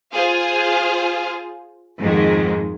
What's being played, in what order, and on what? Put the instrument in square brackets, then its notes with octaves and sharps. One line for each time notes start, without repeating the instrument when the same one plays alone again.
[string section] F4 G#4 C5 F5
F2 G#2 D#3 G#3